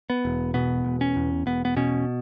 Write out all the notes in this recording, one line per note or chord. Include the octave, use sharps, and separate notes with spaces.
B3
E1
B2 B3
E1
C#4
E2
E1 B3
B3
B2 C#4